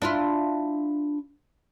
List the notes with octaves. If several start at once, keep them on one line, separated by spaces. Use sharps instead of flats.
D4 E4 F4